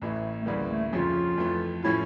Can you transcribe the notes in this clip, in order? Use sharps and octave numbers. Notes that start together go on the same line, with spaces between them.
A1 A2 E3 A3
A3
D2 C#3 E3 G3 A#3
A3
F2 C#3 F3 C#4 F4
F2 E3 A3
A2 F3 C#4 E4 F4